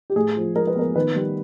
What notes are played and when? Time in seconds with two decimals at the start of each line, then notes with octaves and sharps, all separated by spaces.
0.10 G4
0.16 A2 G#4
0.36 F3
0.55 G#3 A#4
0.67 B4
0.75 B3 A#4
0.96 D#3 B4
1.16 G3